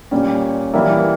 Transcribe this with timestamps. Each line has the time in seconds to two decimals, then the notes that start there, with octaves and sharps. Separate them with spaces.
0.11 A#2 G3 C#4
0.74 E3 G3 A#3 E4